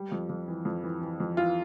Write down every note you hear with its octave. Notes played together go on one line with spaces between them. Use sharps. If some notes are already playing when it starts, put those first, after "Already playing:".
Already playing: G3
F2
F2
E3
F2
E3
E3
F2
E3 F4